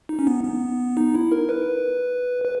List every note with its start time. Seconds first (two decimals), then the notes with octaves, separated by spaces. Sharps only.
0.09 D#4
0.19 C#4
0.27 B3
0.45 B3
0.97 D#4
1.14 E4
1.32 A#4
1.49 B4
2.44 B4